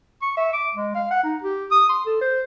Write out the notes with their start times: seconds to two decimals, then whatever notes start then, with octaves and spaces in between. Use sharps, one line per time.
0.22 C#6
0.37 E5
0.53 D6
0.75 G#3
0.95 F5
1.11 F#5
1.24 D#4
1.42 G4
1.72 D#6
1.89 C6
2.06 A4
2.21 C5